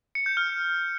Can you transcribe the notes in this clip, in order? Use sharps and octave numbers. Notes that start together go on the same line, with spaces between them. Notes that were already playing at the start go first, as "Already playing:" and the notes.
C#7
G6
F6